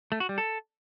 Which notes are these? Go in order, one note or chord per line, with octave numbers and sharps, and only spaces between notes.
A3
F#4
G3
A4